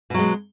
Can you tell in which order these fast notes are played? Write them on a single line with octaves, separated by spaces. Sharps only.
B2 F#3 G#3